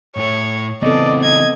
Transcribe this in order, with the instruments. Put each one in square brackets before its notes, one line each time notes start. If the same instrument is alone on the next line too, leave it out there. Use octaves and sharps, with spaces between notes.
[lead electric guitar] A2 A3 [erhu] C#5
[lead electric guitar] C#3 E3 [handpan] B3 C4 A4 [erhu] D5 [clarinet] D#5
[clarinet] D#5 [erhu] G#6